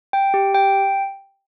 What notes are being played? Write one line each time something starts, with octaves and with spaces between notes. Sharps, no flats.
G5
G4
G5